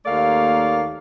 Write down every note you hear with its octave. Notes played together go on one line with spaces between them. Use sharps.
D#2 A3 A#3 D5 F5